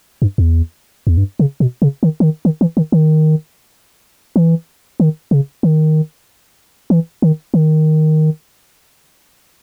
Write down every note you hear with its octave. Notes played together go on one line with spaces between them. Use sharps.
G2
E2
E2
G2
C#3
B2
C#3
D#3
E3
D#3
D#3
E3
D#3
D#3
E3
D#3
C#3
D#3
E3
D#3
D#3